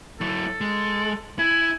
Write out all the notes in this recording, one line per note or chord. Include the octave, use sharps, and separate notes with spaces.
F#3 E4 A4
G#3
E4 G#5